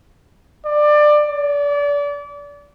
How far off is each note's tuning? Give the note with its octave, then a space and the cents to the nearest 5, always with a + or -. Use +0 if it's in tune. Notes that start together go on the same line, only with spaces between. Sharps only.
D5 +20
D5 -30